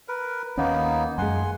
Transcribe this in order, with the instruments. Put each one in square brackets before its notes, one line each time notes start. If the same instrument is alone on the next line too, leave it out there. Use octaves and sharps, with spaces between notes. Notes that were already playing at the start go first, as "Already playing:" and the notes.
[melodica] A#4 B4
[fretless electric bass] D#2 C#4 [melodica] A#3 B3 D#4
[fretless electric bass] F#2 G#3 [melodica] F#5 G#5 C6